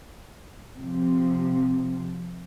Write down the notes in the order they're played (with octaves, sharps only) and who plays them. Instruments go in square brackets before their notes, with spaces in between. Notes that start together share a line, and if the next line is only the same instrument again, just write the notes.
[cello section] C3 F3